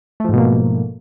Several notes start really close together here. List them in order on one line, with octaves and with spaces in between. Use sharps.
A3 F3 G#2 B2 A#3